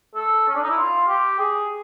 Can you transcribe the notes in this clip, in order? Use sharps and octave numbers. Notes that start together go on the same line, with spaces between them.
A4
C#4
D4
D#4
E4
F4
G4
G#4